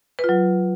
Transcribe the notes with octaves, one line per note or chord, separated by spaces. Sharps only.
B4
F4
F#3